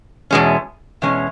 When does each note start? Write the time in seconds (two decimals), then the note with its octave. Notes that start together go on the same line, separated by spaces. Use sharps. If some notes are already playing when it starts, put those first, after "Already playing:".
0.31 E2 B2 G#3 C#4
1.02 E2 B2 G#3 C#4